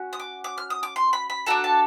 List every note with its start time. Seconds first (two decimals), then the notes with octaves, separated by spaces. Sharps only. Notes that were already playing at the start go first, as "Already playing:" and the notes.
Already playing: C#4 F#4
0.13 D#6
0.19 D6
0.44 D6
0.58 F6
0.70 D#6
0.83 D6
0.96 C6
1.13 B5
1.30 B5
1.46 D4 F#4 A4 A#5
1.64 A5